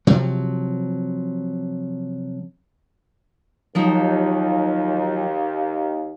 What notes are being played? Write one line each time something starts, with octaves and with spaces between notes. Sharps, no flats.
C3 F3 F#3
D#2 F3 F#3 D#4